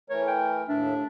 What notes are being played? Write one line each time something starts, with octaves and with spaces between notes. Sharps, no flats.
E3 A3 A#4 C#5
G5
D#2 A2 D4 E5